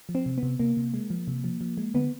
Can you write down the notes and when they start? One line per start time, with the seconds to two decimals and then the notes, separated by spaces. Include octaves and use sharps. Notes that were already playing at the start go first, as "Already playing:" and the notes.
0.09 F3
0.15 C4
0.26 C3
0.38 B3
0.43 C3
0.60 C3 A#3
0.77 C3
0.94 G#3
1.10 F3
1.28 C3
1.44 F3
1.61 F3
1.78 G#3
1.94 D3 B3